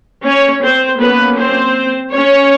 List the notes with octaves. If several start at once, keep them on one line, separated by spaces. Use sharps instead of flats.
C#4 C#5
C4 C5
F#3 A#3 B3 C#4 B4
C4 C5
C#4 C#5